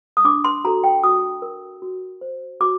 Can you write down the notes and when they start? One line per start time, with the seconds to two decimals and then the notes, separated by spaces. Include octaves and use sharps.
0.17 D#6
0.25 D4 D6
0.44 C6
0.64 F#4 A4 A#5
0.84 G5
1.03 F#4 D#6
1.42 A#4
1.82 F#4
2.21 C5
2.61 F#4 D6